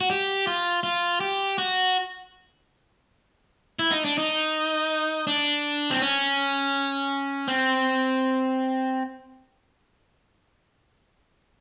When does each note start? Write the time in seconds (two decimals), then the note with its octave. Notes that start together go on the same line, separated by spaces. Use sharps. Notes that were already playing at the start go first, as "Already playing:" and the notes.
0.01 F#4
0.11 G4
0.47 F4
0.83 F4
1.20 G4
1.58 F#4
3.79 E4
3.92 D#4
4.05 D4
4.18 D#4
5.27 D4
5.91 C4
6.01 C#4
7.48 C4